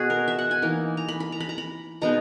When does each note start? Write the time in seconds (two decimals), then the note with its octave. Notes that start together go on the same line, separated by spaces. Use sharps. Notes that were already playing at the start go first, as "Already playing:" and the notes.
Already playing: B2 A#3 F#4 G#4
0.10 A#4
0.28 E5
0.39 F#5
0.51 G#5
0.62 E3 A#3 D#4
0.97 A#5
1.09 B5
1.20 B5
1.32 A#5
1.40 B5
1.49 A#5
1.58 B5
2.01 B2 G#3 B3 D#4 A#5